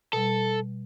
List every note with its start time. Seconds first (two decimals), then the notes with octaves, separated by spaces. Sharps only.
0.13 B2 G3 A4